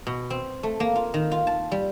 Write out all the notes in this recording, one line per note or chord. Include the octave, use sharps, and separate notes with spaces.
B2
C4
A3
A#3
F4
D#3
F4
A5
G3